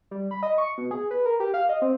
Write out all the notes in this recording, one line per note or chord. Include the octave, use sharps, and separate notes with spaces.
G3
B5
D#5
C#6
B2
G#4
B4
A#4
G4
F5
D#5
C4